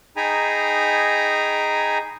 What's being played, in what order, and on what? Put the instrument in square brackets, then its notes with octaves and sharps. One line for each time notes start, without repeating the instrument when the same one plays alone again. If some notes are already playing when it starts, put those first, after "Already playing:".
[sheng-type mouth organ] D#4 G#4 G5 G#5 A#5 B5